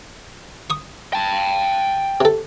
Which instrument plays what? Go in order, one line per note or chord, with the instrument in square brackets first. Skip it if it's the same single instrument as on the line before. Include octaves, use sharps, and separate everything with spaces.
[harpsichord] C#6 D#6
[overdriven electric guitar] G5 A5
[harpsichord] C3 A4